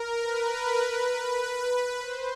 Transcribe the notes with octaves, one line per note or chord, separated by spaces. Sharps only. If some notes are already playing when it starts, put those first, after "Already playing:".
Already playing: A#4
B4
C5